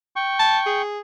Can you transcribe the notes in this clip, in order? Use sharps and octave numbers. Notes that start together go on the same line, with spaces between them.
G5 C#6
A5
G#4